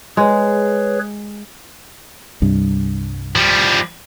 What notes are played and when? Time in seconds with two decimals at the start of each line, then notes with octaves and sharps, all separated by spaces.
0.17 G#3 G#4 B4 C#5
2.42 C2 G2
3.36 F3 G3